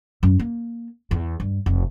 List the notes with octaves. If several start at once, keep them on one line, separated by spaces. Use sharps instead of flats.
F#2
A#3
E2
G2
F1